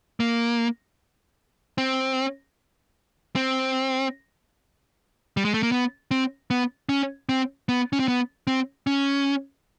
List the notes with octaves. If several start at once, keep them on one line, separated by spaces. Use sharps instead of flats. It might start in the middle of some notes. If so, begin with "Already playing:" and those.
A#3
C4
C4
G3
G#3
A3
A#3
B3
C4
B3
C#4
C4
B3
C#4
C4
B3
C4
C#4